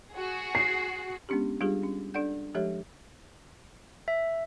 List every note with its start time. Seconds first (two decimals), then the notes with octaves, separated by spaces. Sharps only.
0.14 F#4 G#4
0.55 C7
1.29 G#3 B3 C#4 D4 G4
1.61 G3 D4 F4 G4 G#4
1.83 C#4
2.14 D4 A4 D5 F#5 G6
2.55 F3 G#3 G4 A4 C#5 E5
4.08 E5